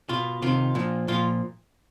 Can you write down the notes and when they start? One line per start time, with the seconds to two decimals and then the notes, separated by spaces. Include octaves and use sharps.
0.09 B2 F4
0.42 C3 D#3 F4
0.75 A#2 F3
1.08 A#2 F3 F4